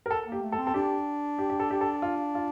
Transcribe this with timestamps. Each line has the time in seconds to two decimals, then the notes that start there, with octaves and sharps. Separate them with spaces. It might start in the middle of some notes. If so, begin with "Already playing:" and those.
0.06 A#4
0.11 A4
0.26 A#3
0.32 G4
0.42 A3
0.52 A4
0.58 C4
0.67 A4
0.74 D4 G4
1.39 G4
1.50 G4
1.60 A4
1.70 G4
1.81 A4
2.02 F4
2.35 F4